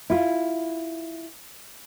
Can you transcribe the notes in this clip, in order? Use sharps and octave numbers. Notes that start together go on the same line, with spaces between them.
E4 F4